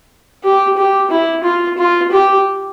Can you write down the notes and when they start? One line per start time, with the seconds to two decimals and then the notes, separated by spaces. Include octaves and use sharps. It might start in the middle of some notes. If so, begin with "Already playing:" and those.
0.44 G4
0.77 G4
1.11 E4
1.44 F4
1.78 F4
2.12 G4